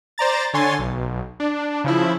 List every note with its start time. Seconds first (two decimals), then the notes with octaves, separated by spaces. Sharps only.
0.18 C5 D5 A#5 A6
0.53 D3 C#5 G#5 C6 A6
0.79 B1
1.40 D4
1.84 C#3 F3 E4